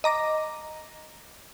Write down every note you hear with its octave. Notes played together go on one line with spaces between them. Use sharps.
D#5 A#5 D6 A#6